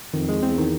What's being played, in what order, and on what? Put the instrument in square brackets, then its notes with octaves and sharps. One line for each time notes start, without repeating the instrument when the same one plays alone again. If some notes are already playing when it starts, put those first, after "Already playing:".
[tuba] F2 [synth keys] D#3
[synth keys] G#3
[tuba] E2 [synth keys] C4
[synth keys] D#3